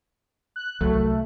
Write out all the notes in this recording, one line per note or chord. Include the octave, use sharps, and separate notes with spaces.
F#6
C2 F#3 A3